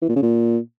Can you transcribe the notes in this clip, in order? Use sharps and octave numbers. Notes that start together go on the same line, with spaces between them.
E3
A#2
C#3
A#2